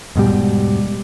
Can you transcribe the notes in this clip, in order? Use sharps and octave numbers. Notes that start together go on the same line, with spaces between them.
E1 G#2 B2 G3